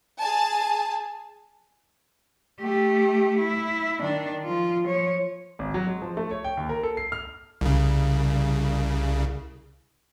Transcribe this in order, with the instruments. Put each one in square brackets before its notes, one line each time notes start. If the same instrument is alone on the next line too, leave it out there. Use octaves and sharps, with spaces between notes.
[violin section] G#4 G#5 A5
[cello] A3 G4
E4
D#3 D4
F3 F4
F3 C#5
[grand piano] G#1
F#3
G#3
F3
A3
C#5
G5
D#2
A#4
A4
C7
F6
[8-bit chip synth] C2 C#3